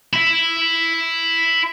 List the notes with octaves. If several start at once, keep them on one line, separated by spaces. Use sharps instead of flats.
E4 E5